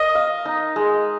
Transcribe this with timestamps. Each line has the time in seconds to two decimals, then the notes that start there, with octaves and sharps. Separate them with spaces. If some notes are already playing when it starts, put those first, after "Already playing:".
Already playing: A#4 D#5
0.15 F5
0.45 D#4
0.76 G#3